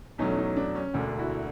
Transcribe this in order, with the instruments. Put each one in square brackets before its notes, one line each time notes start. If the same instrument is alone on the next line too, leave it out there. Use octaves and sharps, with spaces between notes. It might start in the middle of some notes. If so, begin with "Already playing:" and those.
[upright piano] E2 B2 F#3 A3 C#4 D#4
C#4 D#4
D4
C#4
E1 D2 D3 D4
E4 F#4